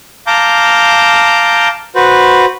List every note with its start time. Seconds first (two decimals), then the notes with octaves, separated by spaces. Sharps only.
0.27 F5 A5 A#5 D6 G6
1.96 F#4 B4 C5